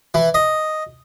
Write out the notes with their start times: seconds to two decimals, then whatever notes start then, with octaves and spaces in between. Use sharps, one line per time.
0.14 E3
0.34 D#5